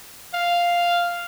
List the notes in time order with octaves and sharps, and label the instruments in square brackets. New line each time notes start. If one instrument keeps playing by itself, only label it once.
[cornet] F5